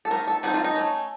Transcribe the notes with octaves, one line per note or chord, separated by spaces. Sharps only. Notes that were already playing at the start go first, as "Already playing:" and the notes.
A4
D#3 F#3 A3 A#4
A4
D#3 A3 C4 D#4 F#4
F4
D#4
A3 C#4